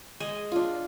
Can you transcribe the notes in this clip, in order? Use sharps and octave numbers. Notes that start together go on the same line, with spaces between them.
G#3 D#5 G#5
D4 F4